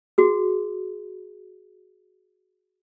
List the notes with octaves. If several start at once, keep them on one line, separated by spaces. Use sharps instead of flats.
F#4 G#4